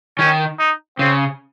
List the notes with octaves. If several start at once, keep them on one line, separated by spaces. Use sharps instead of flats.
D#3 C#4
D#4
C#3 C4